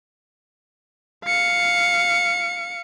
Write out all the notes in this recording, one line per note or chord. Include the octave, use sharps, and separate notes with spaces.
F5 C#7